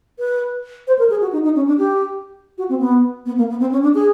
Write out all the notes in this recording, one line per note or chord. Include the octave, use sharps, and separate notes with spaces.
B4
C5
A#4
G#4
F#4
D#4
D#4
C#4
D4
G4
F#4
C4
B3
B3
A#3
B3
C4
C#4
D4
G#4